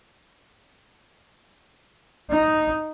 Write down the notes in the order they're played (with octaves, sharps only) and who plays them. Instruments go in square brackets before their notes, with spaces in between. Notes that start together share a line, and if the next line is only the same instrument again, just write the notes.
[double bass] D#4